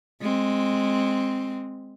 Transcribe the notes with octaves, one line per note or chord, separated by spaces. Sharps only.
G#3 C4